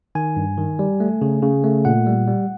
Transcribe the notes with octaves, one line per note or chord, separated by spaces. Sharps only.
D#3 G#5
G2
D#3
G3
A3
C#3
C#3
A3
A#2 F#5
G3
G3